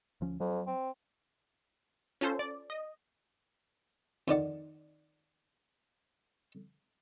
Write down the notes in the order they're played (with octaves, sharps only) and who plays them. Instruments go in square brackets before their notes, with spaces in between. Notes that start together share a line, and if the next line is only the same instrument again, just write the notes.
[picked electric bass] D2 F3 C#4
[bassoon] F2 [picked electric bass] F#3
[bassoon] C4
[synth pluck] C#4 F4 A4 C5
D5
D#5
[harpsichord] F2 D#3 D5 F#5